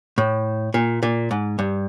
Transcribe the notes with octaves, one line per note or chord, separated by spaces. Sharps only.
A2
A#2
A#2
G#2
G2